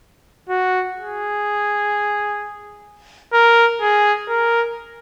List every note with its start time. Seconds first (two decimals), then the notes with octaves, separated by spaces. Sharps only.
0.49 F#4
0.97 G#4
3.33 A#4
3.81 G#4
4.28 A#4